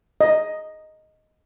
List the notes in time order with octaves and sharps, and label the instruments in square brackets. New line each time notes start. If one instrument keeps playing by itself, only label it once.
[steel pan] D#5